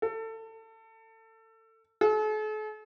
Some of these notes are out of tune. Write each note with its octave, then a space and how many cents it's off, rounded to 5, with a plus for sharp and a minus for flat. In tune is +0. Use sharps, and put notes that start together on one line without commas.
A4 +25
A4 -45